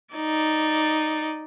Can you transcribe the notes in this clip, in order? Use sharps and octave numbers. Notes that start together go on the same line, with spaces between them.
D#4 D5